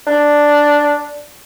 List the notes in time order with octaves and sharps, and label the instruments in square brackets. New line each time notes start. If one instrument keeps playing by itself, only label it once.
[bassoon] D4